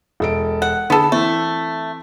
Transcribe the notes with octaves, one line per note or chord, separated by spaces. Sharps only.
E1 A4 D7
F#5
D3 B3 G#4 A4
E3 A3 C4